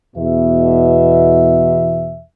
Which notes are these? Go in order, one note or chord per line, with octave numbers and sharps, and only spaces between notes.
E2 B2 E5